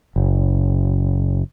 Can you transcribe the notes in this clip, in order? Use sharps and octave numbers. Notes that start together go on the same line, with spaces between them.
F#1